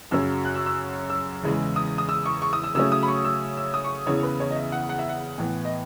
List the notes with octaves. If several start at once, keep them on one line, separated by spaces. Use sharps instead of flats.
F#2 C#3 F#3 C#4 E6
F#6
E6
E6
E6
E2 C#3 E3 G#3
D#6
D#6
E6
C#6
C#6
D#6
E6
C#3 F#3 A3 C#4 E6
D#6
B5
C#6
E6
E6
D#6
C#6
E2 C#3 E3 B3 C#5
B4
C#5
D#5
E5
F#5
F#5
E5
F#5
A2 E3 B3
D#5